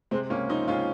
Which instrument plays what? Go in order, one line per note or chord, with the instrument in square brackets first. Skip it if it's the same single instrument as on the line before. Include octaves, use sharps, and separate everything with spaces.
[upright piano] C3 G#3 C4
C#2 A#3 C#4
F3 C4 D#4
C#2 C#4 F4